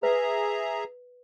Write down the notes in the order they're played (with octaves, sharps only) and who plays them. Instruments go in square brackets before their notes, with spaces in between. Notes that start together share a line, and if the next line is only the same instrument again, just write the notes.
[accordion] G#4 E5 A#5 [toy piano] B4